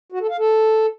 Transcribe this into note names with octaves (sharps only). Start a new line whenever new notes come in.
F#4
A4
F5
A4